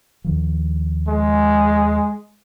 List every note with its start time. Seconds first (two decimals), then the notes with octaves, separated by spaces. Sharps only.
0.24 D#2 D#3 F3
1.08 G#3